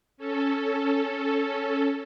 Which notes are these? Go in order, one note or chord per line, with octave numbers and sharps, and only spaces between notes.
C#4 A4